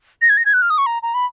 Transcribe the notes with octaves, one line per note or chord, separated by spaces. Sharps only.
A#6
G#6
A#6
G#6
F#6
F6
D#6
C#6
A#5
A#5
B5